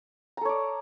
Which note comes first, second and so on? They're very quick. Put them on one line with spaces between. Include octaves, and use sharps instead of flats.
A#5 A4 C#5 D5